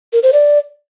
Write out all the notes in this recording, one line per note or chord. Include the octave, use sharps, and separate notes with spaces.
A#4
C5
D5